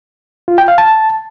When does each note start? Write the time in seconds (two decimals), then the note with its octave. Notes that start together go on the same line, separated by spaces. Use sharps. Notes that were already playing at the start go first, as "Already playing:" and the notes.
0.48 F4
0.58 G5
0.68 F5
0.78 A5